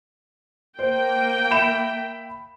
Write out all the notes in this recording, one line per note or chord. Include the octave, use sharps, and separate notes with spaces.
A#3 C5 G5
E5 B5 E7